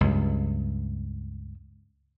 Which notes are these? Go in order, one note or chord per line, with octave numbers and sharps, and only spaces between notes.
C#2 G2